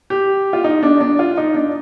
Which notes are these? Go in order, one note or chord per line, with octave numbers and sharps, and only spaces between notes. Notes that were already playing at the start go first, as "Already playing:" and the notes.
G4
F4
D#4
D4
D4
F4
D#4
D4